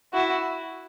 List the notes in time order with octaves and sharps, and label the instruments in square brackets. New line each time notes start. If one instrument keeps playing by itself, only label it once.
[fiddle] E4 [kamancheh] F#4